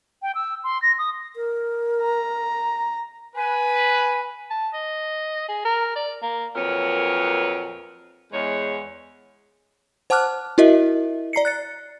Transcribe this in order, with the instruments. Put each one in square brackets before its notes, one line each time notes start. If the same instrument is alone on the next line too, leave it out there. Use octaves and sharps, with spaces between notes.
[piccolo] G5
E6
C6
A#6
D#6
[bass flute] A#4
[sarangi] A#5
[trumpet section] B4 [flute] G#5
[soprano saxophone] A5
D#5
G#4
A#4
D5
A#3
[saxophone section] F2 A#2 F#3 A#4 B4 C#5
E2 G#3 C#5
[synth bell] C5 F#5 A5 D6 F6 F#6
E4 F#4 A#4 D#5 E5
D5 A#5 C7 C#7
F#6 A6 C#7